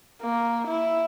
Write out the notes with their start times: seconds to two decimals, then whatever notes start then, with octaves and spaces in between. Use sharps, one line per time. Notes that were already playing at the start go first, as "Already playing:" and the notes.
0.22 A#3
0.67 E4